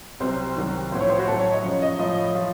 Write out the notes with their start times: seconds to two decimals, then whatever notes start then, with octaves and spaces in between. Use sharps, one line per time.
0.20 C2 C3 F#3 C5
0.56 C2 C3 D#3 F#3
0.92 F3 C5
0.95 A2
1.01 C#5
1.10 C5
1.19 F#4
1.28 A2 F#3 A4
1.39 C#5
1.52 D#5
1.63 F#2 C#3 F3
1.82 D#5
1.99 A2 F3 D#5
2.35 F3